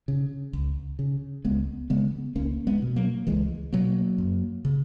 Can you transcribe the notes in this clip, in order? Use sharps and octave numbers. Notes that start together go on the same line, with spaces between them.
C#3
C#2
C#3
C#2 G#3 B3
C#3 G#3 B3
C#2 A#3 C#4
G#3 B3
B2
F#3 A#3
C#2 E3 G#3
B2 F#3 A#3
F#2
C#3